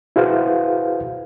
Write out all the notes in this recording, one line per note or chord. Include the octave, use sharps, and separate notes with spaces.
E4 F#4 G#4 B4 C5 F5